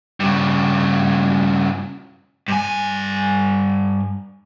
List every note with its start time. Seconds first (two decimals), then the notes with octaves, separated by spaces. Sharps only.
0.20 G2 C#3
2.48 G2 G#5